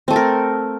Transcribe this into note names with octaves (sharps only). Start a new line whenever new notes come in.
A3 C4 A4 A#4